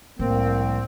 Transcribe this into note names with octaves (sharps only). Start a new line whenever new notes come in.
C2 A2 F3 A#3 C4